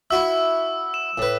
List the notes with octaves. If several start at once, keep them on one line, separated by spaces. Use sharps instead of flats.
E4 F#4 E5 E6
E7
A2 B4